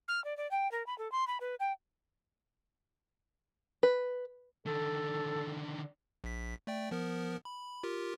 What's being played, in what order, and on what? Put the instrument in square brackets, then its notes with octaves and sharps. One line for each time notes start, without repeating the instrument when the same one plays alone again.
[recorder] F6
D5
D5
G5
A#4
B5
A4
C6
B5
B4
G5
[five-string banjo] B4
[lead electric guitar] D3 D#3 [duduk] A4
[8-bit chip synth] A#1 B6
A3 D5 G5
F3 B3 A#4
B5
F4 G4 A#4